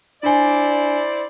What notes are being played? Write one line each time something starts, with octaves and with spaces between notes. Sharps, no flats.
D4 E4 C5 D5 G#5